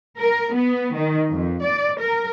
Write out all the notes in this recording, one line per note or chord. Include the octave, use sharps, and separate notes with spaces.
A#4
B3
D#3
F2
D5
A#4